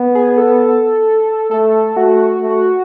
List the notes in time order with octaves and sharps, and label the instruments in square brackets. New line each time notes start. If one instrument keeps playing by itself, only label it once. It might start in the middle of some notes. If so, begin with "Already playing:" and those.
Already playing: [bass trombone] B3
[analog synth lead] G#4
A4
[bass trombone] A3 [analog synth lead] A4
[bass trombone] A3 [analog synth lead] F#4
[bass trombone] A3